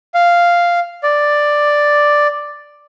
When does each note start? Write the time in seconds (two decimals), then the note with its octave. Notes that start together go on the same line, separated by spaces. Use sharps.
0.14 F5
1.03 D5